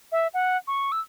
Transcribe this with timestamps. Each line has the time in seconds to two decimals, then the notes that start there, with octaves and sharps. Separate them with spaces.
0.12 E5
0.34 F#5
0.67 C#6
0.92 E6